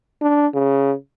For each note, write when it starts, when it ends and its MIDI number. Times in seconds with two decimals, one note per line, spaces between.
0.21 0.47 62
0.54 0.93 49